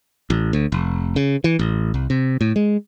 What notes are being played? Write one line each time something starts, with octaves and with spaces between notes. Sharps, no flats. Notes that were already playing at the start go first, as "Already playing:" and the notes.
A1
D2
F1
C#3
E3
A1
C2
C3
A2
G#3